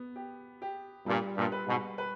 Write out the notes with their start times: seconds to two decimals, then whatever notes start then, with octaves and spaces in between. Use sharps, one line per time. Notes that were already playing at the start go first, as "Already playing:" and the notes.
Already playing: B3
0.16 G4
0.62 G4
1.06 G2 A#2 G3
1.37 G2 A#2
1.52 B4
1.67 G#2 B2
1.98 B4